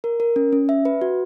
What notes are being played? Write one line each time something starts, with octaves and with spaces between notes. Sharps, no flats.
A#4
A#4
C#4
C#4
E5
B4
F#4